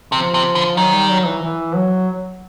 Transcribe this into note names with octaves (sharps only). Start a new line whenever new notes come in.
C3 F3
C3
D3
D#3 F#3
G3
F#3
E3
E3
F#3